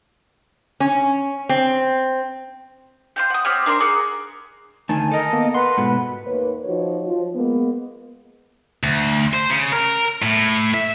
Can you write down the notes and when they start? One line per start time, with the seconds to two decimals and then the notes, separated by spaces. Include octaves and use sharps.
0.80 C#4
1.49 C4
3.16 G4 F5 C6
3.30 F#5 D#6
3.45 C4 G4 C#5 F6
3.66 D4 A#4 D5 C6
3.80 G#4 A#4 F#5 D6
4.89 D2 D#3 G#5 A5
5.11 A4 A#4 D#5
5.33 A#3 B3
5.54 B4 F#5 C6
5.78 G#2 B2 F#5
6.26 D#2 A#3 B4 C#5
6.64 F3 D#4 F#4 C#5
7.04 F3
7.35 G#3 A#3 B3
8.83 D2
9.34 C5
9.50 C#3
9.73 A#4
10.22 A2
10.74 E5